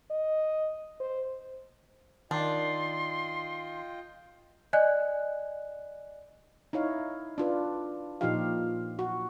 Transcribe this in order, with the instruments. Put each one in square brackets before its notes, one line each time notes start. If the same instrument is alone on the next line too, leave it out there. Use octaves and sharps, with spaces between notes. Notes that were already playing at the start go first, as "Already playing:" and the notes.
[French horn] D#5
C5
[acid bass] D#3 [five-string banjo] D4 [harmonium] F4 D#5 G5 [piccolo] C6
[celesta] D5 D#5 G#5 F#6
[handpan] D#4 E4 C#5 F5
D4 F4 B4
A#2 F3 D#4 F4 G4 F5
F#4